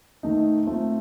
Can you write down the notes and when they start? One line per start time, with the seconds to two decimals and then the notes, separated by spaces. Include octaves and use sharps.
0.23 D#3 A3 D#4
0.66 A3 C4 F4 C5